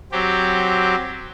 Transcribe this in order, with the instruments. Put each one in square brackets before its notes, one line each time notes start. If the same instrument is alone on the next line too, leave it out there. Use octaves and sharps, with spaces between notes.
[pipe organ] F#3 C4 G4